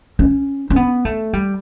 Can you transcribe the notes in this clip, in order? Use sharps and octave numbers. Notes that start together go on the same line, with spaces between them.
C#4
C#4
B3
A3
G3